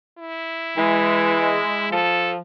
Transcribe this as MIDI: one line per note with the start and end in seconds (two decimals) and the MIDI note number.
0.18 1.89 64
0.77 1.58 52
0.77 1.95 56
1.92 2.39 53
1.92 2.32 69